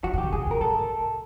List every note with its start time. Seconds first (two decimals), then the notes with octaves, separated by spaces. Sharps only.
0.04 D#3 F#4
0.14 D3
0.18 C#3 G4
0.32 C3 G#4
0.47 B2
0.51 A#4
0.60 A2 A4